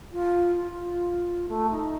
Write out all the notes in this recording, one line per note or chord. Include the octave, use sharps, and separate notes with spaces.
F4
F4
A3
D#4